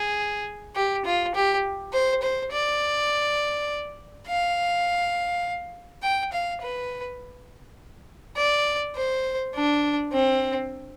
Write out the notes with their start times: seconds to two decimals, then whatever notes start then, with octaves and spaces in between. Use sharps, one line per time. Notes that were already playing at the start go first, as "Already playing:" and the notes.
Already playing: G#4
0.75 G4
1.05 F4
1.35 G4
1.93 C5
2.22 C5
2.52 D5
4.27 F5
6.02 G5
6.32 F5
6.61 B4
8.37 D5
8.96 C5
9.54 D4
10.12 C4